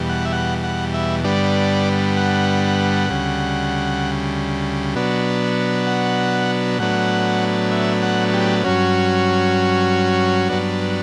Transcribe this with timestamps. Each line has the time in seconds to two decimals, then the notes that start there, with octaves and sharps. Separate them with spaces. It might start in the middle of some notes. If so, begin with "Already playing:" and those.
Already playing: E2 B2 G3
0.09 F#5
0.26 E5
0.33 F#5
0.64 F#5
0.94 E5
1.24 G2 D3 G3 B3 D5
2.17 F#5
3.10 D2 C#3 G3
4.95 B2 F#3 B3 D4
5.87 F#5
6.79 A2 F#3 B3 D4 F#5
7.71 E5
8.03 F#5
8.34 G4
8.64 G2 F#3 C#4 F#4
10.49 G2 F#3 B3 D4